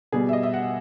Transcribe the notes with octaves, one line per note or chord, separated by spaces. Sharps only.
B2 G3 G#4
E5
D#5
E5
F#5